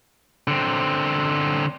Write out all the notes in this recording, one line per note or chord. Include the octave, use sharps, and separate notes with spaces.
D3 C4